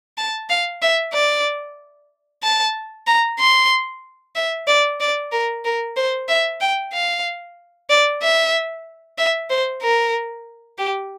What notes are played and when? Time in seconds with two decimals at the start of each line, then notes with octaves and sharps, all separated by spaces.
0.17 A5
0.49 F5
0.82 E5
1.13 D5
2.43 A5
3.07 A#5
3.40 C6
4.35 E5
4.67 D5
5.00 D5
5.32 A#4
5.65 A#4
5.96 C5
6.29 E5
6.61 G5
6.93 F5
7.89 D5
8.22 E5
9.18 E5
9.50 C5
9.82 A#4
10.78 G4